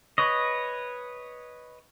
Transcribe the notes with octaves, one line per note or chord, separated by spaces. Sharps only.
B4 C#5 D#5